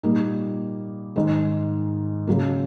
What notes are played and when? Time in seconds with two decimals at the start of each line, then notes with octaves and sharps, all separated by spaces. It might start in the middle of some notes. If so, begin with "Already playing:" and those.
0.03 A#2 G3 A#3 D#4
1.16 G#2 D#3 G#3
2.27 C#3 F#3 A#3